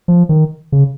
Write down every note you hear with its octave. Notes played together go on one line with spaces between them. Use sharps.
F3
D#3
C#3